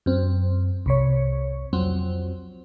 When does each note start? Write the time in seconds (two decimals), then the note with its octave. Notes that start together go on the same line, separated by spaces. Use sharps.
0.06 F#2 C4
0.86 C2 C3 C#5
1.73 F2 F#3 C4